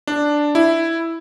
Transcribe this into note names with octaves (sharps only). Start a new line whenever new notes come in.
D4
E4